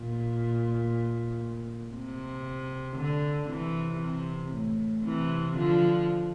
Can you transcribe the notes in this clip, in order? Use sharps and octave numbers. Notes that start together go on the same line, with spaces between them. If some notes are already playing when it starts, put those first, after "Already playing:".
Already playing: A#2
C3
D3
C3 E3
C3
A2
C3 E3
D3 F3